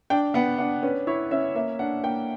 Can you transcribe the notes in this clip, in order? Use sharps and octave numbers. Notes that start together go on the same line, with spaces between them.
D4 G5
B3 F#5
D4 F#5
C#4 B4
E4 C#5
C#4 E5
A#3 E5
D4 F#5
A#3 G5